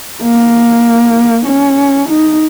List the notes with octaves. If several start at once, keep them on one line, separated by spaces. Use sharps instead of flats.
A#3
C#4
D#4